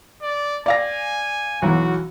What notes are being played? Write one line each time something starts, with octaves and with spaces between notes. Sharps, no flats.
D5
D5 F5 G#5 A#6
B1 E3 F#3 F#4